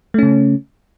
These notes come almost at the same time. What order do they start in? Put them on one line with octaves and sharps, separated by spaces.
A3 C#4 C#3